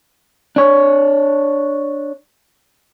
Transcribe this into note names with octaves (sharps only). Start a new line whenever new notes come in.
D4 C#5